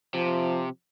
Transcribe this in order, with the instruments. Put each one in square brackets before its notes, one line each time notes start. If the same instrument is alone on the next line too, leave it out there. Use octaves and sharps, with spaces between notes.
[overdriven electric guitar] C3 [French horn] F3